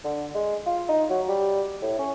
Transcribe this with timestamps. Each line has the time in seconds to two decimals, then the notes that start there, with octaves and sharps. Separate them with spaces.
0.05 D3
0.34 G#3
0.66 F4
0.89 D#4
1.10 F#3
1.28 G3
1.82 A2
1.99 C#4